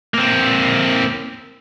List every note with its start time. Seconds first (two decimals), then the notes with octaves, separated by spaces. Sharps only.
0.14 A#3 C4